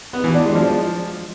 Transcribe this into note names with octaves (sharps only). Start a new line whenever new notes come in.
B3
E3
D4
G#3
F3